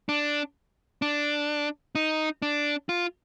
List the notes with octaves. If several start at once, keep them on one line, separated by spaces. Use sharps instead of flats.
D4
D4
D#4
D4
F4